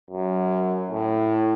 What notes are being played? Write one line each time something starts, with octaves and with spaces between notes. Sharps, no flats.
F#2
A2